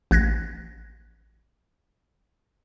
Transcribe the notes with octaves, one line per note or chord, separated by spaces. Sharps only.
A1 F#6 G#6 A#6